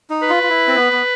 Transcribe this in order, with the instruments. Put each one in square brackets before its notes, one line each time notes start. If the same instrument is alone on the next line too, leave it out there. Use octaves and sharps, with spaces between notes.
[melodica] D#4
[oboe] B4
[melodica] F4
F4
E4
C4
B3
B3